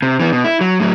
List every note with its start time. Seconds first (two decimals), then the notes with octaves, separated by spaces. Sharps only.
0.02 C3
0.20 E3 B3
0.33 B2
0.44 E4
0.61 F#3
0.80 A2 F#3